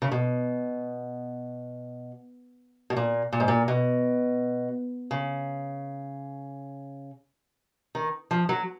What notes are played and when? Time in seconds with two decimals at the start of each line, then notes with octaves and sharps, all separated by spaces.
0.02 C#3
0.12 B2
2.90 B2
2.97 A#2
3.33 A#2
3.40 G#2
3.48 A#2
3.68 B2
5.11 C#3
7.95 D#3
8.31 F3
8.49 F#3